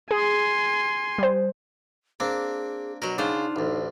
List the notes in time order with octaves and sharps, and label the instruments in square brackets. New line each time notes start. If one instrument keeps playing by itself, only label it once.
[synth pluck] G#4 [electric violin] G#5 C6
[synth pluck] G3 C5
[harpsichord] A#3 C4 [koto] D4 [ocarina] G#4
[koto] B2 F#3 [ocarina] F#4 [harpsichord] A#4
[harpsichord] C#3 [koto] D4 F4 C5 [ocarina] D#4
[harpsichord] A1 D2